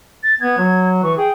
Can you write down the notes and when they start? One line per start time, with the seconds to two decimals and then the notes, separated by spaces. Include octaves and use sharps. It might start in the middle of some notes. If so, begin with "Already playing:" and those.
0.23 A6
0.41 B3 G#6
0.58 F#3
1.03 E3 C#6
1.17 G#4 G5